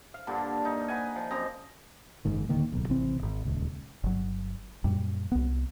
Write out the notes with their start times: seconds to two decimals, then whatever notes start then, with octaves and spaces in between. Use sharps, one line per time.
0.14 F5
0.27 G2 A#2 D3 D4
0.65 D#4
0.88 B4 F#5 G#5
1.15 F3
1.30 F#2 C4 D#5 A#5
2.25 F#1 G#2 D#3
2.49 D1 D3 D#3 A#3
2.72 D1 B1
2.89 G#1 C3 E3 C4
3.18 D1 G#1
3.45 D#1 C#2
4.04 G1 F#3
4.84 F#2 A#2 G3
5.32 C2 B3